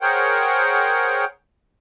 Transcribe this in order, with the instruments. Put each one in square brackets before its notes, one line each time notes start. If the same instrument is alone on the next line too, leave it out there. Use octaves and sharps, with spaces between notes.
[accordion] G#4 A#4 C5 C#5 F#5 G5